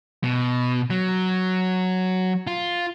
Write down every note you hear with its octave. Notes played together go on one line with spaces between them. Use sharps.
B2
F#3
F4